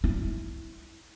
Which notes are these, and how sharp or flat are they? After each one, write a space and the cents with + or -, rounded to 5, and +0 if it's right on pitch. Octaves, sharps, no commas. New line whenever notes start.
E4 -10